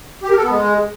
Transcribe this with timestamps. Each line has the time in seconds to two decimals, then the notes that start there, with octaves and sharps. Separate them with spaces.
0.23 G4
0.30 A#4
0.37 A4
0.44 B3
0.51 G#3